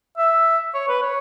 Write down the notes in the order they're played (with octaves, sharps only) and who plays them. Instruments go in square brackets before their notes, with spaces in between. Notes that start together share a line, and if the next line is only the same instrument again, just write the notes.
[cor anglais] E5
C#5
B4
C#5